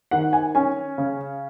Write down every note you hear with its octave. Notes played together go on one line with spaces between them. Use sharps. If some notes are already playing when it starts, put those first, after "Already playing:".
D#3 F#5
G#5
C#4 G#5
C#3